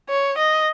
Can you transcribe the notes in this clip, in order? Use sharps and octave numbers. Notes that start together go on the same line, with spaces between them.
C#5
D#5